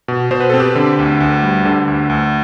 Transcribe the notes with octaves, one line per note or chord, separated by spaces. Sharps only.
B2
B2 C5
B4
C4 A4
G4 B4
D3
D2
D2
G3
D3
D2
D2